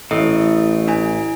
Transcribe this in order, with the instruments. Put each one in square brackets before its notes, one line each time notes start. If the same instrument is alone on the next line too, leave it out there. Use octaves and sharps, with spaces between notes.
[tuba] A1 [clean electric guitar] A2 [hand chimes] E4 A4 D#5
[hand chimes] D4 E4 G#5